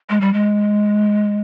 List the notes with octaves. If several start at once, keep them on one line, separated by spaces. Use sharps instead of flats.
G#3
G3
G#3